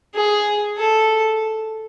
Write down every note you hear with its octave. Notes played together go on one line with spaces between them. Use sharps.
G#4
A4